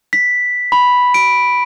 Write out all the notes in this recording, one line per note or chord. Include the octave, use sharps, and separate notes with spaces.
B6
B5
D7